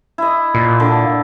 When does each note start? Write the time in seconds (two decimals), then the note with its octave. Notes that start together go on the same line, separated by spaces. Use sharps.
0.18 E4 D#5
0.55 A#2
0.80 D3